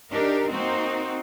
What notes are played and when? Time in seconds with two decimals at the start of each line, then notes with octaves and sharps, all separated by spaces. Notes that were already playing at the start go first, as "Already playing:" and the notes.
0.12 D4 D#4 G4 A#4
0.50 A#3 C4 D#4 F#4